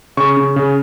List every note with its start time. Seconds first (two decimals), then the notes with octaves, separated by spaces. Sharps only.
0.17 C#3 C#6
0.37 C#3
0.56 C#3